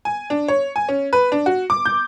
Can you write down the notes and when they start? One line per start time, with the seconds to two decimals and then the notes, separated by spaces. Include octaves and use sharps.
0.05 G#5
0.30 D4
0.48 C#5
0.76 G#5
0.89 C#4
1.13 B4
1.32 D4
1.46 F#4
1.70 D6
1.85 G6